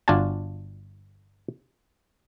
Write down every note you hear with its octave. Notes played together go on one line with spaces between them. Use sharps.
G1 D4 F4 F#4 G#5 A5